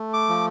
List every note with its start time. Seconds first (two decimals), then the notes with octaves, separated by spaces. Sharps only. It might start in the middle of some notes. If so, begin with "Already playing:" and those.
Already playing: A3
0.13 D6
0.29 F3